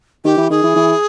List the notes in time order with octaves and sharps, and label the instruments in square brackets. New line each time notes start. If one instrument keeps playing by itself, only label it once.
[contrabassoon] D#3 [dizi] G4
[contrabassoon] E3
[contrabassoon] D#3 [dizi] G#4
[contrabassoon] E3
E3